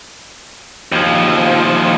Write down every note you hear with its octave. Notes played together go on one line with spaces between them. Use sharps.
D#2 F3